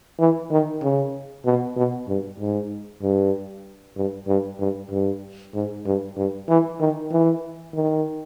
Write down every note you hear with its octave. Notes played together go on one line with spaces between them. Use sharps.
E3
D#3
C#3
B2
B2
G2
G#2
G2
G2
G2
G2
G2
G#2
G2
G2
E3
D#3
E3
D#3